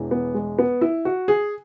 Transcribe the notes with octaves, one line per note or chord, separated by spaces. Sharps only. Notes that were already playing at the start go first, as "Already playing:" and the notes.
Already playing: E1 E2 E3
B3
G#3
B3
E4
F#4
G#4